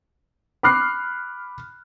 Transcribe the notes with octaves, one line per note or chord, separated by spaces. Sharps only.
B5 D6 F6 F#6 C7